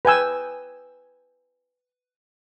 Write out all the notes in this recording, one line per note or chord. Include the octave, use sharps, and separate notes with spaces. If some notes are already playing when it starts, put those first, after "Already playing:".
B4 G5 G#5 E6